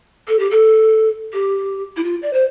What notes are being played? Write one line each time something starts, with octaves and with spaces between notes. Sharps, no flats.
A4
G4
A4
G4
E4
F4
D5
C5